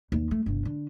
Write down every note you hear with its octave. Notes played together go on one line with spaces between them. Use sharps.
D#2
A3
G1 C3
D3